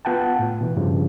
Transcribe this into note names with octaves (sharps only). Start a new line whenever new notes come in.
B3 F4 F#5 G5 A5
A2
B2 E3
G2 C#3 F3